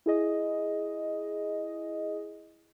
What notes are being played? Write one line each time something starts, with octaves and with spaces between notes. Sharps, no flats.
E4 G#4 D#5